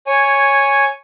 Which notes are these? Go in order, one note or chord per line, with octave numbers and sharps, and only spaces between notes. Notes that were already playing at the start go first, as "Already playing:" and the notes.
C#5 G#5